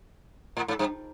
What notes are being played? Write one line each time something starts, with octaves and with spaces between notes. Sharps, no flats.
A2
G#2
G2